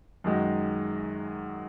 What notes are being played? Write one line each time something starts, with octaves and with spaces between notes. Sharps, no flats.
F#2 D#3 G#3 D#4 F#4